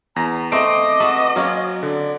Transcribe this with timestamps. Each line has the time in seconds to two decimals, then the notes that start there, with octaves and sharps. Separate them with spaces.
0.16 E2 A#5 A#6
0.52 A3 C4 D#5 D6 C7 D7
1.00 F#4 A4 B4
1.36 F#3 A#3 C4 C#4
1.83 D3 D5